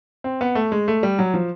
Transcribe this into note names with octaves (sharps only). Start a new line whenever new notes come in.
C4
B3
A3
G#3
A3
G3
F#3
F3